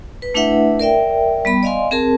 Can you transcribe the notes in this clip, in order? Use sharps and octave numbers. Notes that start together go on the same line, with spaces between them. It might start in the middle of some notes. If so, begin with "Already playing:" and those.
B4
A3 D4 E4 B4 E5 F#5
A#4 D5 E5 G5
G3 B3 B5
D5 D#5 F5 G#5 C6
C4 G#4 A#4 A5